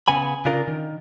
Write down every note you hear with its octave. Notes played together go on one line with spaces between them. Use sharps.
C#3 B3 G#5 B5
C#3 D4 F4 A#4
D#3